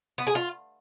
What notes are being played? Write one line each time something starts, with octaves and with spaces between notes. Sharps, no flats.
B3
G#4
F4